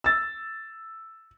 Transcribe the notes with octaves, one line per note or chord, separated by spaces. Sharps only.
E6 A6